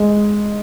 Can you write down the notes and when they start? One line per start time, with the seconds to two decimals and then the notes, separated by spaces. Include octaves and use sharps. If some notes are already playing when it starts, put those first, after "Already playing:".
Already playing: G#3